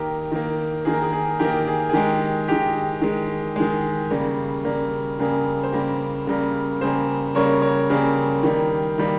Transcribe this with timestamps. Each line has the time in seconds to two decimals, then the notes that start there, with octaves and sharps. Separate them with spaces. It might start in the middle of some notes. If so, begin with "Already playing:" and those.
Already playing: D#3 A#3 G4 A#4
0.32 D#3 A#3
0.85 D#3 A#3 G#4
0.93 A#4
1.02 G#4
1.12 G#4
1.39 D#3 A#3 G4 A#4
1.67 G#4
1.89 G#4
1.93 D#3 G#3 G4
2.48 D#3 G#3 G4
3.02 D#3 G#3
3.56 D#3 G#3 G#4
4.11 C#3 G3 A#3
4.65 C#3 G3 A#3
5.19 C#3 G3 A#3 G#4
5.63 C5
5.73 C#3 G3 A#3 G4 A#4
6.27 C#3 G3 A#3
6.81 C#3 G3 A#3 G#4 C5
7.35 C#3 G3 A#3 A#4 C#5
7.62 A#4 C#5
7.90 C#3 G3 A#3 G#4
8.43 D#3 G3 A#3
8.98 D#3 G3 A#3